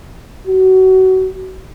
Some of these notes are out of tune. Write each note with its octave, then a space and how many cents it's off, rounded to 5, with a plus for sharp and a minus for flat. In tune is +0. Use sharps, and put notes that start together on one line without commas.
F#4 +25